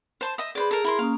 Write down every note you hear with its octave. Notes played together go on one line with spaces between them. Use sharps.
C5 A5 C6
D#5 E5 D#6
G#4 B4 C5 D5
A4 A#4
E4 A#4 C6
A#3 C#4 F5 D#6